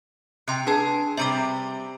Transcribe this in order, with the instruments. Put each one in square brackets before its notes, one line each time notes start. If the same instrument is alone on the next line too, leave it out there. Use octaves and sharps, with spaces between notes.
[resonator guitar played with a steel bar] C3 [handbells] G5 C6 F#6
[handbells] D4 B4 A5 [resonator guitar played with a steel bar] G#4
[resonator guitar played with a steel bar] C3 G3 C4 [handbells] E5 A#5 D6